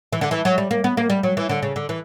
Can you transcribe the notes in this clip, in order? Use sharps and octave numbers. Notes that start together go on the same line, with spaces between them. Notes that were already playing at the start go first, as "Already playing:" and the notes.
E3
D3
E3
F#3
G3
A#3
B3
A#3
G3
F#3
E3
D3
C#3
D3
E3